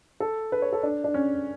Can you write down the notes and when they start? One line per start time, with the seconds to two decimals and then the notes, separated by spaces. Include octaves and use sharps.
0.20 A4
0.52 B4
0.62 C#5
0.73 A4
0.83 D4
1.04 D4
1.14 C#4